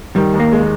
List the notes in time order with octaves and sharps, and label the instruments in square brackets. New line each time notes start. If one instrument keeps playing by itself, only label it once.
[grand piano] D#3 [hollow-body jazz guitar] G3
[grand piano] D#2
[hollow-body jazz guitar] A#3
[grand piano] G#3